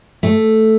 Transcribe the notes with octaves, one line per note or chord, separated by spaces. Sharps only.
A3